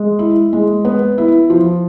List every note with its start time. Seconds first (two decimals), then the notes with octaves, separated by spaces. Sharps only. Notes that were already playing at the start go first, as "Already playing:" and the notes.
Already playing: G#3
0.19 E4
0.53 G#3
0.85 B3
1.18 E4
1.50 F3